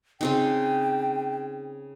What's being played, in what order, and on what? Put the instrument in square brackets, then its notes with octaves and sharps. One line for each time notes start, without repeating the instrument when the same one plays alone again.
[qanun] C#3 C4 D#4 [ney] G5